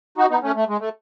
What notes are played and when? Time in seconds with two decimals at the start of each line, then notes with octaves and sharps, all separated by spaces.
0.18 D#4 F#4
0.30 B3 D#4
0.43 A3 C#4
0.56 A3
0.68 G#3
0.80 A3